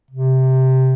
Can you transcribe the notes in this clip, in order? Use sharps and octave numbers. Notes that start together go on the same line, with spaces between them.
C3